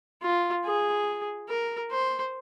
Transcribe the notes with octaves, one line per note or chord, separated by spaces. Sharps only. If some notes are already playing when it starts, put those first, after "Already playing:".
F4
G#4
A#4
C5